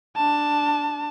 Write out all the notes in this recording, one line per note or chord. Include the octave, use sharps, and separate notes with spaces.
D4 A5